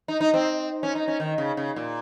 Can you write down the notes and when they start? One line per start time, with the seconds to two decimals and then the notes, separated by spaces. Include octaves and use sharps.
0.08 D#4
0.21 D#4
0.34 C4
0.83 C#4
0.95 D#4
1.08 C#4
1.20 D#3
1.38 C#3
1.57 C#3
1.76 A#2